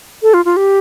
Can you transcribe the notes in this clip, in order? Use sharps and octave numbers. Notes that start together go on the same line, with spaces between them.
A4
F4
F4
G4